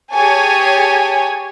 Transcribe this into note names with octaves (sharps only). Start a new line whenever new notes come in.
G4 G#4 C#5 G#5 A5